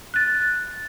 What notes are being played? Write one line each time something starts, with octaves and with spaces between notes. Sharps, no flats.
F#6 A6